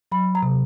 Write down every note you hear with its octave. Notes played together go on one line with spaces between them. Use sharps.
F#3 B5
A#5
C3